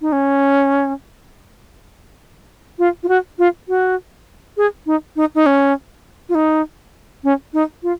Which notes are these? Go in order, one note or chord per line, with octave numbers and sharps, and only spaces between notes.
D#4
C#4
F4
F4
F#4
F4
F#4
G#4
D#4
D#4
D#4
C#4
F4
D#4
C#4
D#4
F4